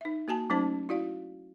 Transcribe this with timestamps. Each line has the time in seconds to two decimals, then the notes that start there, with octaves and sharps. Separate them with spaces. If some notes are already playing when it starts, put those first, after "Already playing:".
0.01 D#4 E5
0.28 A#3 F#4 G#5 A5
0.50 F#3 A3 C#4 D#4 C5 A5
0.89 E4 F#4 D5 F5